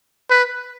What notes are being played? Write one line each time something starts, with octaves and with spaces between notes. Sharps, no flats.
B4